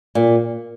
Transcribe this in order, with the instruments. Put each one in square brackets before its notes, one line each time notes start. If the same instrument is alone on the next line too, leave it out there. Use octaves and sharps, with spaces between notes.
[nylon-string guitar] A#2